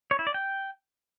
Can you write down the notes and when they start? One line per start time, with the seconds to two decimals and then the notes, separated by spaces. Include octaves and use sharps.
0.11 C#5
0.19 E4
0.27 D5
0.34 G5